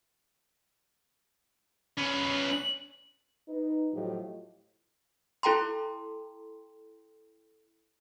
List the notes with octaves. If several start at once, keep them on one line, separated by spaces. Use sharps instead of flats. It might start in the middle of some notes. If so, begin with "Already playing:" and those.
C#4 B4
F#7
D#4 B4
A2 F3 F#3 F4 G4 D#5
E4 A4 G5 A#5 C6